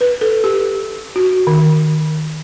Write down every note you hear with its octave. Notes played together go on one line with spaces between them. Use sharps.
B4
A4
G4
F#4
D#3